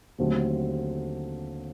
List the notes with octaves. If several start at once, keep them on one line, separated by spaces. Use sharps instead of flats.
D#2 D3 F#3 A3 C4